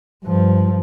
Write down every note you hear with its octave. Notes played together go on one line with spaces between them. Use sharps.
G2 F3